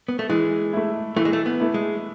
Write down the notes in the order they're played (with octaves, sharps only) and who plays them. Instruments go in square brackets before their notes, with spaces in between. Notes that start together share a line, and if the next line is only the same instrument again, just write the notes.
[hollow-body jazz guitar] B3
A3
[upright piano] E3 [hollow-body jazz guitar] G#3
[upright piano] A3 E4
[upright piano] E3 [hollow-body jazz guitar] A3
[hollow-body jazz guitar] G#3
A3
B3
[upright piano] A3 E4
[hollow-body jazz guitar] G#3